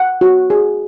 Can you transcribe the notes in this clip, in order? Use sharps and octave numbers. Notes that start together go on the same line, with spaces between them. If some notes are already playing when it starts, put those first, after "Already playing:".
Already playing: F#5
F#4
G#4